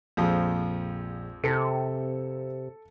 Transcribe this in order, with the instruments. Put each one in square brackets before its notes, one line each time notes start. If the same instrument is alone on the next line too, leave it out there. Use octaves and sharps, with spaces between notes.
[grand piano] A#1 [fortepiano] F2 F3 G#3
[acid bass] C3 [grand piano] A4 C#7